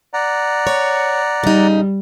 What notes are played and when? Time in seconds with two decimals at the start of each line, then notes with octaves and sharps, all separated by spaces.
0.13 D5 F#5 A#5
0.67 C#5
1.44 C#3 G3 D#4